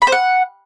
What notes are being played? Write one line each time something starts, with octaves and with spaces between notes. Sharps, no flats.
B5
C5
F#5